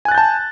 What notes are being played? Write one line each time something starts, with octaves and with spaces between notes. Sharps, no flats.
G#5 A5 F#6 G6 A6